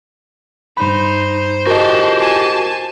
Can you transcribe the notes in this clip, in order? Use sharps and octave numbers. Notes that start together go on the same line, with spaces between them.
G2 D#4 C5 B5
F#4 G4 A#4 D#5 A5
G#5 A5